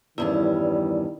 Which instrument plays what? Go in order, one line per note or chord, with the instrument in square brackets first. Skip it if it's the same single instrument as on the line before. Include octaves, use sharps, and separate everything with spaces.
[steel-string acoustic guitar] E2 G2 C#4 [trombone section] D#3 G3 [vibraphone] E4